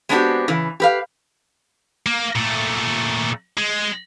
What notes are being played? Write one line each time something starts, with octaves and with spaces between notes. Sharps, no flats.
G#3 B3 C4 D4 F#4 G4
C#3 E3
G4 B4 F5
A#3
A#2 A3
G#3